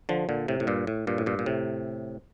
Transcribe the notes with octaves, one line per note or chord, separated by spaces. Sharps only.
D3 F3
A#2 D3
A2 C3
A2
G2 A#2
A2
G2 A#2
A2
G2 A#2
A#2
A2 C3